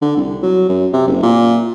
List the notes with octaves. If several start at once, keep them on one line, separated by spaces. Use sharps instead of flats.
D3
C2
F#3
F#2
C3
F#1
A#2